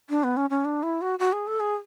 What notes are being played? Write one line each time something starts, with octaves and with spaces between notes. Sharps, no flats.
D4
B3
C#4
C#4
D4
E4
F#4
F#4
G#4
A4
G#4